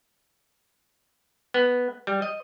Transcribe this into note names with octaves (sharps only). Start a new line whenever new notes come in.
B3
G3
D#5